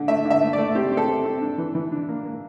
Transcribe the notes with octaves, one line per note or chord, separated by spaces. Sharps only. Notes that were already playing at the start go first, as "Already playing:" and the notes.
Already playing: D3
A3 E5
D3
E5
A3
A3 D5
C4 G4
C4
A4
C4
C4
D4
E3
E3
D4
A#3
A#3